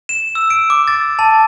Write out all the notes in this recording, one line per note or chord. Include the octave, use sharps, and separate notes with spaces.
E7
E6
D7
D6
A6
A5